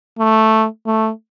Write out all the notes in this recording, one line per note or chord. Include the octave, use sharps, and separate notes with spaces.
A3
A3